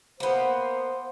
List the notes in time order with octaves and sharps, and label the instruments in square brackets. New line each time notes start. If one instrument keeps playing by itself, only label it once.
[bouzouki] A#3 B3 [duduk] C5